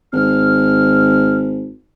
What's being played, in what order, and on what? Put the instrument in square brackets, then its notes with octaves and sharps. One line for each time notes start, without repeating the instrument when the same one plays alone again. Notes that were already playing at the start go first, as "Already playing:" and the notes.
[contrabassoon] G#1 [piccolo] F6